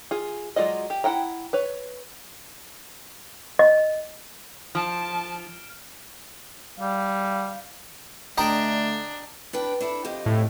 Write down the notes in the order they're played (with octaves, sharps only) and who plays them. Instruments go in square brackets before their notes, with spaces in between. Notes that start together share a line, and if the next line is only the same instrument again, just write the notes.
[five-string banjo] F4 G#4
F#3 G#3 F4 D5 D#5
G4
E4 F#5 G5 A#5
B4 C#5
[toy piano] D#5
[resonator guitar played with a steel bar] F3 [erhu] A5 [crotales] F6 D7 E7
[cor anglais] G3 [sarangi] F5
[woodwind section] D3 A3 [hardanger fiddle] D4 [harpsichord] D#5 G5 A#5
[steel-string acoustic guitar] D4 B4 G5
D4 E4 A4
F2 G4 D#5
[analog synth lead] A2